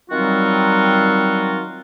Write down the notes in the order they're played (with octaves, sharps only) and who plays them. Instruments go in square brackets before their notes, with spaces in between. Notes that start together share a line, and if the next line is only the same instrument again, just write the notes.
[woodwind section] D#3 F#3 G3 C4 F4 F#4